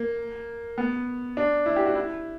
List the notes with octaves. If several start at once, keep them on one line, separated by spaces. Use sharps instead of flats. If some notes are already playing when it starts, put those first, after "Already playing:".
Already playing: A#3
B3
D4
E4
G4
F#4
E4